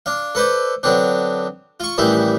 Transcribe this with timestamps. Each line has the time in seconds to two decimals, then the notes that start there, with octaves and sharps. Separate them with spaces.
0.06 D4 F5
0.35 A4 B4 C5 D5
0.83 D3 F#3 B3 C4 D4
1.80 F4 C#6
1.98 A1 D#3 E3 G3 E4 A5